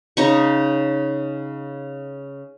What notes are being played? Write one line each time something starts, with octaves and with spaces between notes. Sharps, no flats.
C#3 D#4 C#6